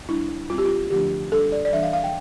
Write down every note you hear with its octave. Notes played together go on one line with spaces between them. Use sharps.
G3 D4 E4
G3 C4 F4
G4
F4
D3 F3 A3 D4 G4
G3 D4 A4
D5
D5
E3 G3 D4 E5
F5
F5
G5